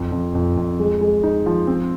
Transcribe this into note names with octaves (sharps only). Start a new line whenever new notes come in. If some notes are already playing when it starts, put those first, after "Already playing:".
Already playing: F2
F2
F2
F2
G#3
G#3
D#4
F3
C4